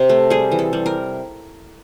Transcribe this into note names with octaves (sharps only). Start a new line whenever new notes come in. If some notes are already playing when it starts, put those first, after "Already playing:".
Already playing: C3
A3
G3 G#4
E3
A4
G3
A#4